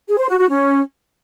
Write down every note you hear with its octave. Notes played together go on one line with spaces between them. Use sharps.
G#4
C5
F#4
F#4
C#4